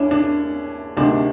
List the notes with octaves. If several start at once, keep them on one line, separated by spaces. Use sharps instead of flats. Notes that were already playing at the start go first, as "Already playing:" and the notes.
Already playing: D#2 C#4 D4 E4
D4
D2 C3 D#3 D4